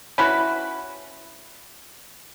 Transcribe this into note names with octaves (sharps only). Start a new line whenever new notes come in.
C#4 E4 F#4 B4